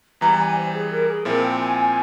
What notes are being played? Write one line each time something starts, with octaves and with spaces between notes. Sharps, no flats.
E2 E3 G3 A#5
A#5
G#5
C5
G#4
A#4
G#4
A#2 F3 C4 E4 A#4
G5
G#5